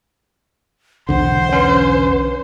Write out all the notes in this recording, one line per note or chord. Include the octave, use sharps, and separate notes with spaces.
B1 E2 D3 C5 F#5
C#4 B4